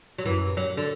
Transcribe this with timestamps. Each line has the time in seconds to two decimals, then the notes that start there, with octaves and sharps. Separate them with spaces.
0.18 F#3
0.25 F#2 E3
0.57 F#3
0.77 D3